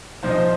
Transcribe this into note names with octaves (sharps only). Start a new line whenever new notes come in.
C2 A#2 F3 D#4 C5
D#5
C5